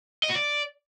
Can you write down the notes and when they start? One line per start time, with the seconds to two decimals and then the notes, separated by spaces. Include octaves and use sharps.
0.23 D#5
0.29 F#4
0.35 D5